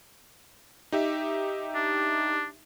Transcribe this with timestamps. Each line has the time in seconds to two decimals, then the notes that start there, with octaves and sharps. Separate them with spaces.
0.92 D#4 G4 E5
1.75 D4